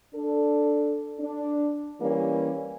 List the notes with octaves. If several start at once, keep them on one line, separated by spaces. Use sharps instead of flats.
D4 A4
D4
E3 G3 A#3 C#4